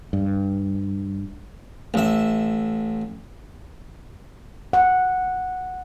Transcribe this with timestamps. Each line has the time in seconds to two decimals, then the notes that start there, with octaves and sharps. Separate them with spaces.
0.13 G2
1.94 A1 E5
4.73 F#5